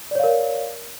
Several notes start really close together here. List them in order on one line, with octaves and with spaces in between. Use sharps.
D5 C#5 F5 A#4